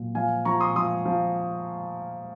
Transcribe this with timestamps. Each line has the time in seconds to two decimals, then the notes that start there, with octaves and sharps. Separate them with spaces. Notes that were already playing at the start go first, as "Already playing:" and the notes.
Already playing: A#2 F#3
0.15 F3 F5 G#5
0.45 F3 A#5 C#6
0.61 C6 D#6
0.76 F3 C6 D#6
1.05 F3